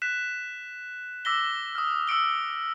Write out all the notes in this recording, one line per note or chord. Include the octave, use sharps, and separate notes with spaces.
F#6 B6 E7
D6 E6 A#6 B6 G7
D#6 F6
E6 C#7 D7 G7